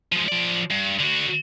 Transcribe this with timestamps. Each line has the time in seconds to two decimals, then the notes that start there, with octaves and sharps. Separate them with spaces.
0.12 F3 G#3
0.28 F3 D5
0.70 G2
0.99 D3 F#4